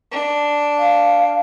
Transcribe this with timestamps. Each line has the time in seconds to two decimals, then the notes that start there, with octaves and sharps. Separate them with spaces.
0.12 D4
0.79 F5